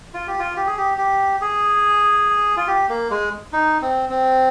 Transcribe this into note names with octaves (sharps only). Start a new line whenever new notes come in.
F4
G4
F4
G4
G#4
G4
G4
G#4
F4
G4
A#3
G#3
D#4
C4
C4